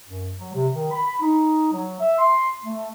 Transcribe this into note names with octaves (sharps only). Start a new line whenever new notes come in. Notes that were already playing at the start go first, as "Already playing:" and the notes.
F#2
F#3
C3
D#3
B5
D#4
F#3
E5
C6
A3